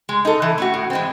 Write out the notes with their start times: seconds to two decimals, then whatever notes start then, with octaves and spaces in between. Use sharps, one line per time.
0.09 G#3
0.25 D#4 A4
0.42 E3
0.58 A3 C#4 F#4
0.74 A2
0.90 E3 G#3 C4